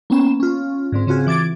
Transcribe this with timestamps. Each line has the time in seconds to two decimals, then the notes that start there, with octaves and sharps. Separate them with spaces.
0.10 A#3 B3 C#4 E7
0.40 C#4 F4
0.92 G#2 D3 C4
1.07 C#3 C4 F4 F#4 G#4
1.27 E3 D6 G#6 A6 D7